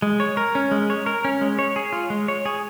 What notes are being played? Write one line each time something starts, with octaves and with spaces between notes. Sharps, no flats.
G#3
C#5
A#4
C#4
G#3
C#5
A#4
C#4
G#3
C#5
G#4
F4
G#3
C#5
G#4